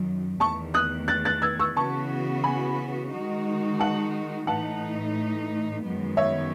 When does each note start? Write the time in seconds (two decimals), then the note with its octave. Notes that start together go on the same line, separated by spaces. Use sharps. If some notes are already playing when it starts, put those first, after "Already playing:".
Already playing: F#2 D#3 F#3
0.40 E2 D#3 A3 A5 C#6
0.74 D#6 F#6
1.08 F#6 A6
1.25 F#6 A6
1.42 E6 G#6
1.59 C#6 E6
1.76 C#3 E3 B3 F#4 A5 C#6
2.44 G#5 B5
3.12 D#3 G#3 D#4 F#4
3.80 F#5 A5
4.47 A2 E3 A3 D#4 F#5 A5
5.83 F#2 D#3 G#3 B3
6.17 C#5 E5